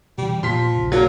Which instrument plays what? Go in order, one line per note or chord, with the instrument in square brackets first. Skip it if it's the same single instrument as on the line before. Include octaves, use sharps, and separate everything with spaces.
[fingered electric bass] B2 E3 [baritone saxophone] G3
[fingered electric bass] A#2 B3 [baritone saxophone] F3 [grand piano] C6 B6
[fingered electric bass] D#1 A#1 C#3
[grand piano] F#3 [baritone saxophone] A#3